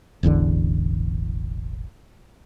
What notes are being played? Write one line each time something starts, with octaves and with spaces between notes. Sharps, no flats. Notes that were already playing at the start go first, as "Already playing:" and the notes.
E1 A1 E2 D3